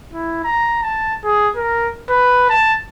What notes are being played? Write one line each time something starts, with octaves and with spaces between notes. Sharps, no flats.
E4
A#5
A5
G#4
A#4
B4
A5